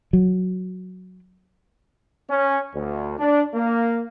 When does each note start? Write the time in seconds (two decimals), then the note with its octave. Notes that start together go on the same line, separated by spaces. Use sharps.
0.13 F#3
2.30 C#4
2.75 D2
3.18 D4
3.55 A#3